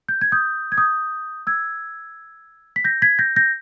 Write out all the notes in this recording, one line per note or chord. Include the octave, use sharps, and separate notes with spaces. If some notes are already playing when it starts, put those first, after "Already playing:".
G6
G#6
D#6 G6
G#6
D#6 G6
E6 G#6
B6
G6 A#6
G#6 B6
G6 A#6
G6 A#6